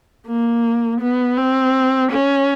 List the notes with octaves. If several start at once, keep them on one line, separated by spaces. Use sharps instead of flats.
A#3
B3
C4
C#4